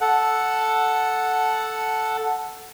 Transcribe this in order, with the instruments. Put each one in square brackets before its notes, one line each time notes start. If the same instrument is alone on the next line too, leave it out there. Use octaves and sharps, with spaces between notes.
[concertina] A4 F#5